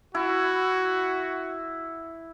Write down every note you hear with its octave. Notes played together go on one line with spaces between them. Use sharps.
E4 F#4